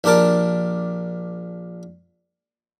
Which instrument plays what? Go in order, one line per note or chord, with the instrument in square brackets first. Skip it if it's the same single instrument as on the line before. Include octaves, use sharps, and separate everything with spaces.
[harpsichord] A#1 D4 G4 A#4 A5 D6